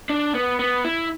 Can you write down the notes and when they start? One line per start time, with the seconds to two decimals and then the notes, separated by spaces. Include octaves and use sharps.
0.10 D4
0.35 B3
0.59 B3
0.85 E4